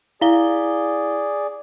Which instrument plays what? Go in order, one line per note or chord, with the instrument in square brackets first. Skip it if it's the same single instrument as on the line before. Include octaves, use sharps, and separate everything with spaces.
[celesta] E4 F5 G7 [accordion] G#4 D5